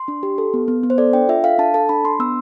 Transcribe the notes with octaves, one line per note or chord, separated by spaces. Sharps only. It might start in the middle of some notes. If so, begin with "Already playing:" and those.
Already playing: C6
D4
G4
A4
B3
B3
B3
C5
A4 D5
D4 G5
F4 E5
A4 F5
D4 A5
A4 A5
D4 B5
D4 C6
B3 E6